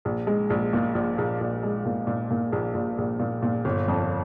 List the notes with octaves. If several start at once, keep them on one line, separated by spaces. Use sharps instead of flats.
A#1
G#3
A#1
A#2
A#1
A#1
A#1
G#3
A#2
A#2
A#2
A#1
A#1
A#1
A#2
A#2
G1
F2